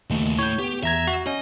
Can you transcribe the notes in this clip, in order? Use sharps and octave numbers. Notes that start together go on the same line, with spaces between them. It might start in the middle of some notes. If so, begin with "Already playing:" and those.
D#2 C#3 A3
A3 E4 C#5 G6
B3 G4
E2 E5 A#5 G#6
F#4
C#4 D#5